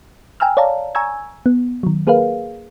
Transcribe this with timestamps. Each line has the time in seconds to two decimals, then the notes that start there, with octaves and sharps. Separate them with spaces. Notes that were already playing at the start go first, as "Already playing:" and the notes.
0.40 G5 G#5 A#5 E6 F6
0.57 C#5 D5 F5 A5 A#5
0.95 G#5 A#5 C#6 E6 G#6
1.46 B3
1.83 D#3 F#3
2.07 A#3 G#4 A#4 B4 F5